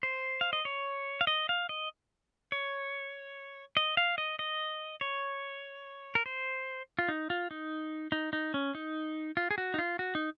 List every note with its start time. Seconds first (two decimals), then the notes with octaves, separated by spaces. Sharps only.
0.03 C5
0.41 F5
0.53 D#5
0.65 C#5
1.21 F5
1.27 D#5
1.49 F5
1.69 D#5
2.52 C#5
3.77 D#5
3.97 F5
4.18 D#5
4.39 D#5
5.01 C#5
6.15 A#4
6.26 C5
6.99 F4
7.09 D#4
7.30 F4
7.51 D#4
8.12 D#4
8.33 D#4
8.54 C#4
8.75 D#4
9.37 F4
9.51 G#4
9.58 F#4
9.74 D#4
9.79 F4
9.99 F#4
10.15 D#4